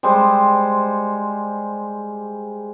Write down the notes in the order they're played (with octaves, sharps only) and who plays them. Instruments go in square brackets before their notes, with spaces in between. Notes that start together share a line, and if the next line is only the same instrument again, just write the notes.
[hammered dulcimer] G3 G#3 C5